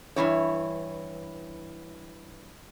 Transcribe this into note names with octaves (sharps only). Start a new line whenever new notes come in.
G2 D#3 E3 C#5